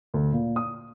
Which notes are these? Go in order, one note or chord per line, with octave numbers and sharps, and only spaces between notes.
D2
A#2
D#6